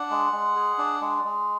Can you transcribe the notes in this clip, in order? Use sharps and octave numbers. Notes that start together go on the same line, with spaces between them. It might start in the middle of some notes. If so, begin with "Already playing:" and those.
Already playing: D4 F#5
G#3
G#3
G#4
D4
G#3
G#3